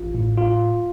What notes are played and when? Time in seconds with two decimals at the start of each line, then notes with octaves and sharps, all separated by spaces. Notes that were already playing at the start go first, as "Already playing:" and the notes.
Already playing: A1 F4
0.15 A2
0.37 F4